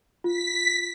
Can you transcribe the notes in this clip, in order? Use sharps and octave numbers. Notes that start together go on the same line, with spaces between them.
F4 B6